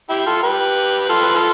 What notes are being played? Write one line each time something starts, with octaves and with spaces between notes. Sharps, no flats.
E4 G4
F4 A4
G4 B4
F4 A4
B4
F4 A4